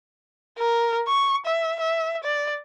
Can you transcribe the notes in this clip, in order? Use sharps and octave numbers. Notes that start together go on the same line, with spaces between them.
A#4
C#6
E5
E5
D5